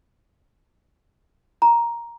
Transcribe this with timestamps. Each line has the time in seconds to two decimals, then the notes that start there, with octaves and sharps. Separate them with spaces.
1.62 A#5